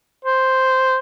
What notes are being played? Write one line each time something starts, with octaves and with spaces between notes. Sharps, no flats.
C5